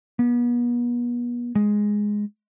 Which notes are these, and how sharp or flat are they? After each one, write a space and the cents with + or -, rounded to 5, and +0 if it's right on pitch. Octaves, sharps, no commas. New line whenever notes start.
B3 -40
G#3 +0